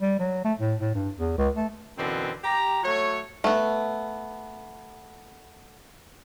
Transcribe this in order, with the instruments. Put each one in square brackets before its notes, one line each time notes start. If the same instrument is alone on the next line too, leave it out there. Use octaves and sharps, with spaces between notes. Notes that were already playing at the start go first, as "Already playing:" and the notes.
[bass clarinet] G3
F#3
A3
A2
A2
G2
E2
C#2
A3
[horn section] F#2 B2 D3 E3 C4
G4 A#5
F#3 A3 C#5
[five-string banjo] A3 B3